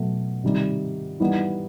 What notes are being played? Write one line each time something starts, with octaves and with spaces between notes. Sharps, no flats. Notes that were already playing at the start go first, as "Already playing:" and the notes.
Already playing: B2 F#3 A3
C3 D#3 G3 D#4
E3 G3 B3 D#4